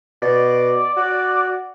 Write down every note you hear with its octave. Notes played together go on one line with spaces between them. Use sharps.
B2 D5
F#4